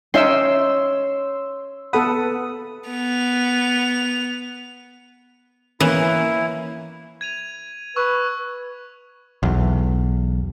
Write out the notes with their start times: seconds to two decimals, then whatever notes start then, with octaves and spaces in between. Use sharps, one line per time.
0.14 C#4 D#4 E5 G5 C6 E6
1.93 B3 A4 B4 F#5 D#6
2.89 B3 F7
5.80 E3 A#3 B3 C#4 E4
7.21 G#6 D#7 F7
7.96 B4 C#6 E6
9.43 B1 E2